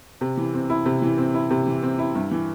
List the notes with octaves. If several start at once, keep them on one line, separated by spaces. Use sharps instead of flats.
C3
E3
C4
E4
C3
E3
C4
E4
C3
E3
C4
E4
G2
E3